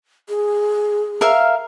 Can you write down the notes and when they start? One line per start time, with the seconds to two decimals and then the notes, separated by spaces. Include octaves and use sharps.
0.29 G#4
1.21 A#4 E5 F5